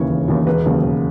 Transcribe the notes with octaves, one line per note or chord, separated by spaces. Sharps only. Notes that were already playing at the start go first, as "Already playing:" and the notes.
Already playing: D#2 C#3 E3 C#5
E1
D#2 C#3 E3
E1 B4
D#2 C#3 F#3
E1